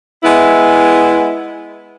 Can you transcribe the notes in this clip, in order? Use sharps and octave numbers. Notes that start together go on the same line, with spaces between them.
G#3 B3 E4